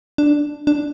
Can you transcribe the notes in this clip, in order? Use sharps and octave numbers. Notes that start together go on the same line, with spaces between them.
D4
D4